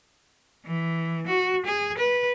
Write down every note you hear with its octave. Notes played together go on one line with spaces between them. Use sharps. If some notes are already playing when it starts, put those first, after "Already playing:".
E3
F#4
G#4
B4